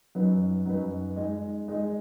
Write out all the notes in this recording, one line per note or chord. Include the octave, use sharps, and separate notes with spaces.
F#2 F#3 D#4 B4
F#2 F#3 D#4 B4
G#3 D#4 G#4 D#5
G#3 D#4 G#4 D#5